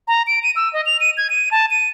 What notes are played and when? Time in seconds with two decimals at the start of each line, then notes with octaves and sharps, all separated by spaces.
0.08 A#5
0.27 D7
0.43 D#7
0.56 E6
0.73 D#5
0.86 F7
1.00 D#7
1.17 G#6
1.30 D#7
1.51 A5
1.71 D#7